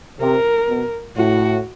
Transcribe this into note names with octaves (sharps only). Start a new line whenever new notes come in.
C3 A#4
B2
A2 F#4